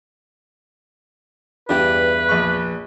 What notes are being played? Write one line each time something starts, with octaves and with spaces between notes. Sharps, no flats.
E2 G2 E3 D4 G4 B4
A#1 C#6